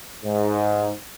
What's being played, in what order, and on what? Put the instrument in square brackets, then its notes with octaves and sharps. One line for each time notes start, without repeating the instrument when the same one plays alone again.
[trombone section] G#2